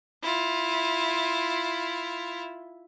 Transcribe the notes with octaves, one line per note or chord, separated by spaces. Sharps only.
E4 F4